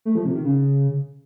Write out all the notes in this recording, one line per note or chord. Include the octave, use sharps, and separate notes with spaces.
A3
F3
C3
D#3
C#3